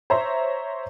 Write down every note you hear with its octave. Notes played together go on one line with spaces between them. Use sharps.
C5 C#5 E5 A#5 C6